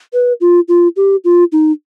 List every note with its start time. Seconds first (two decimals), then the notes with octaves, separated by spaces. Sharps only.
0.13 B4
0.41 F4
0.68 F4
0.97 G4
1.25 F4
1.52 D#4